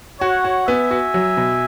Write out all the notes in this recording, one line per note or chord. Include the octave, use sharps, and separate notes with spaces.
F#4 C#5 F#5
F#4
B3 E5 G#5
F#4
F#3
B2